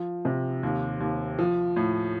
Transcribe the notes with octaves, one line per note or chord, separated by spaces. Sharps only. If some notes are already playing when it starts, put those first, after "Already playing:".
Already playing: F3
C3
D#2
D#2
F3
A2